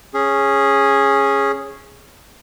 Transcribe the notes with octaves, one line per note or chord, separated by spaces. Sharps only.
C#4 G#4